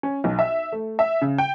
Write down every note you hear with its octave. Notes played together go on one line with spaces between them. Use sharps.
C#4
B1
E5
A3
E5
C#3
G5